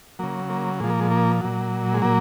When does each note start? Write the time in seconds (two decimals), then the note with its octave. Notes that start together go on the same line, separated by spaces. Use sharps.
0.19 C#3 F#3 A#3
0.49 A#3
0.80 A#2 F3 G#3
0.90 A#3
1.00 G#3
1.11 A#3
1.41 A#2 F#3
1.94 G#3
2.02 A#2 F#3 A#3